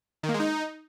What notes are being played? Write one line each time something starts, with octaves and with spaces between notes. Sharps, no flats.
D#3
A#3
G#3
D#4